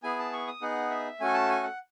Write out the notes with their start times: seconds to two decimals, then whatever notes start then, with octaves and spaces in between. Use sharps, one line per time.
0.03 B3 E4 G#4 G#5
0.19 A5
0.33 C#6
0.47 D#6
0.61 B3 D#4 G#4 F#5
0.90 E5
1.20 A3 C#4 F#4 A4 G#5
1.34 A5
1.49 G#5
1.63 F#5